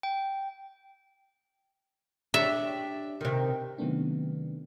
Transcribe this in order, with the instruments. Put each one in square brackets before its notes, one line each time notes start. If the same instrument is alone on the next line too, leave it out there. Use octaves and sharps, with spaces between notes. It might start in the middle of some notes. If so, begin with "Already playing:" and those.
[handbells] G5
[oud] D4 G4 C#5 [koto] E5
[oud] C3 D#3
[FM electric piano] C3 D#3 F#3 A3 B3 D4